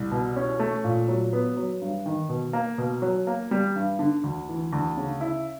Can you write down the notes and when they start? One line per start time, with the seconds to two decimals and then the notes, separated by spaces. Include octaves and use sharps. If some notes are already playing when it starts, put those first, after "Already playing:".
Already playing: C2
0.11 B2
0.36 C#4
0.59 A3
0.84 A#2
1.08 F#3
1.33 B3
1.57 F#3
1.81 G2
2.06 D#3
2.29 B2
2.53 A#3
2.78 B2
3.02 F#3
3.27 A#3
3.51 G3
3.76 G2
3.99 D3
4.24 D2
4.49 E3
4.73 D2
4.97 C#3
5.21 E4